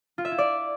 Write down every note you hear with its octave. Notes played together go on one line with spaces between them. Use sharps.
F4
E5
E4
D5